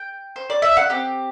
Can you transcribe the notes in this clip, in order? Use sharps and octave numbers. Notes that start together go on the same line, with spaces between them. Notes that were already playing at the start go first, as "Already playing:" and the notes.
Already playing: G5
C5
D5
E5
F#5
C4 G4 G5